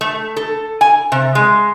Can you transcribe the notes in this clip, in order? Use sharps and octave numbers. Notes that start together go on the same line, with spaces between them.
A3
A4
G#5
C3
G#3